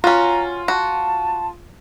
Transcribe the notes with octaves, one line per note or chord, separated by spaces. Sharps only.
C#4 F4 F#4 A#5
F#4 A5